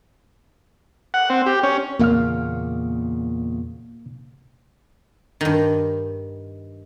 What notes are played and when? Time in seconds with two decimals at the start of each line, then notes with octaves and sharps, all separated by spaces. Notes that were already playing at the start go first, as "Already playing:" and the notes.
1.14 F#5
1.30 C4
1.46 G4
1.63 C#4
1.99 E2 A#2 C#3 A#3 F5 F6
5.41 G2 D#3